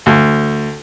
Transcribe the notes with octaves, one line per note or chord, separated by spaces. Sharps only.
D2